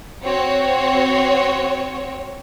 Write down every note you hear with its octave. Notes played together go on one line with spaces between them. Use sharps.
C4 F#4 C#5